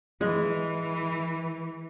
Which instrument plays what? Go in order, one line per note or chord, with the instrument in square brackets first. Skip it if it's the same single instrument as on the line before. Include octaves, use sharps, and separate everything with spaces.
[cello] E3 [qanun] G#3